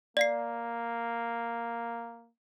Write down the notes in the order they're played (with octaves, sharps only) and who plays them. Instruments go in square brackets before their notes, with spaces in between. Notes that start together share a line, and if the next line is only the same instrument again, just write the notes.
[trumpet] A#3 [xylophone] D5 F5 C7